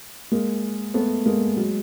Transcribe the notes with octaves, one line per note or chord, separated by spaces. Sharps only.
G#3 A#3
A3 B3
G#3 A#3
F#3 G#3